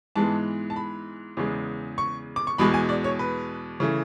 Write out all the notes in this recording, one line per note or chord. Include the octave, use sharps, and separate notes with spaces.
G#2 E3 G#3 B3 A5
A5
B5
E2 C#3 G#3
C#6
D6
C#6
E2 B2 G#3 B5
G#5
D5
C#5
B4
C#3 E3 A3